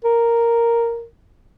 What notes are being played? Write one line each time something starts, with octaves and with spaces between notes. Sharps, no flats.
A#4